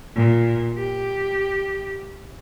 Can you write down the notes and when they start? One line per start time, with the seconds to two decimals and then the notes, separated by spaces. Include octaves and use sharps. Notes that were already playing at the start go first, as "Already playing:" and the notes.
0.16 A#2
0.78 G4